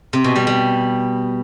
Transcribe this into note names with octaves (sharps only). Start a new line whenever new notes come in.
C3
B2
G3
G3